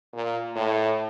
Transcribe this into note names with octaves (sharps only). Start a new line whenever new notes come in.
A#2
A2